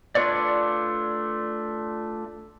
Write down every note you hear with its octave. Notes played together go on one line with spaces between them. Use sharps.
A3 D4 F4 B4 C#5 D5